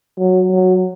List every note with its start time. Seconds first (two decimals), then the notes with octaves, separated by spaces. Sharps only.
0.18 F#3
0.51 F#3